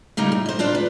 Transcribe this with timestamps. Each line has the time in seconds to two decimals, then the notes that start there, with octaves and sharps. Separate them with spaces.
0.17 C#3 G3 A#3 D#4
0.32 A2
0.46 C5 D#5
0.59 D4 F4 B4 D5
0.75 B4